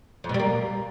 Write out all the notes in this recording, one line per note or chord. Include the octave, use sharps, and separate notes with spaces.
F2
B2
G3
A#3